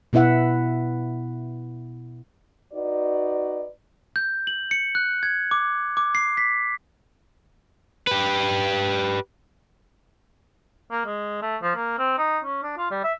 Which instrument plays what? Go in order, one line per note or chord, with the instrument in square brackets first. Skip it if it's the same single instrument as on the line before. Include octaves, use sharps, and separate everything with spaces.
[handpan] B2 B3 E4 E5 F#5
[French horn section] D#4 F#4 B4 D5
[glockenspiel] G6
F#7
C#7
F#6
G#6
D6
D6
C7
B6
[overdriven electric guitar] G4 B4
[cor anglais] A#3
G#3
A3
F3
A#3
C4
D#4
C#4
D4
F4
G3
E5